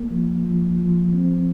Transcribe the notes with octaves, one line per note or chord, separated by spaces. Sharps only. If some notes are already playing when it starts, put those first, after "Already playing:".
Already playing: A#3
F3
F3
F3
C4